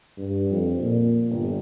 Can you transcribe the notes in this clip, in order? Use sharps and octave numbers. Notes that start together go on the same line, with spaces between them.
G2
F2
A#2
G1